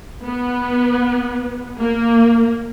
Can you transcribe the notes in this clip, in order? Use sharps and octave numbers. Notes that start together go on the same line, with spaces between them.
B3
A#3